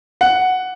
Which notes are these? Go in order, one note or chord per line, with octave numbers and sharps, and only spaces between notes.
F#5